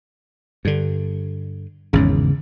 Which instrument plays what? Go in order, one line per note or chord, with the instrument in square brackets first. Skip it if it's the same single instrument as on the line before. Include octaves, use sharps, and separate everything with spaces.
[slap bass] G2 D3
[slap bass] G#1 E2 G#2 [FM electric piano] C#3